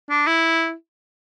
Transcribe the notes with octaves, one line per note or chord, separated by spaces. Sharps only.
D4
E4